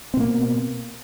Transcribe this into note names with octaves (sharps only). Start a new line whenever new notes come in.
B2 A#3 C4